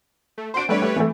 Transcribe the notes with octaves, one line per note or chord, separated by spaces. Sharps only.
A3
D4 F#4 C5 C6 D7
G3 A3 D4 B4 C#5
A3
E3 A3